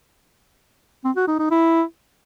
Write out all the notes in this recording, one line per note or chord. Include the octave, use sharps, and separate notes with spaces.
C4
F#4
D#4
D#4
E4